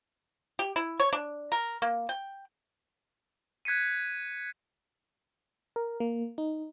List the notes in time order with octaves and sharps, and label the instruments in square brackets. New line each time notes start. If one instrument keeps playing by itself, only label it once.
[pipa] G4
E4
C#5
D4
A#4
A#3
G5
[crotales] F#6 G#6 B6 C#7 D#7
[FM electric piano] A#4
A#3
D#4